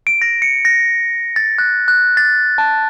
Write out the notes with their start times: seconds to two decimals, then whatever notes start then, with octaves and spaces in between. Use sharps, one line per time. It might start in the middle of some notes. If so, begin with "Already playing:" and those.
0.07 D7
0.22 A#6
0.42 C#7
0.65 A#6
1.36 A6
1.58 F#6
1.88 F#6
2.17 A6
2.58 A5